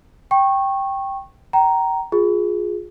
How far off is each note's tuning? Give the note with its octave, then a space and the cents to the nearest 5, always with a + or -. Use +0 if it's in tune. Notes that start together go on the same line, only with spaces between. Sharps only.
G5 +0 C#6 -20
G5 -35 A#5 +0
F4 +25 G#4 +0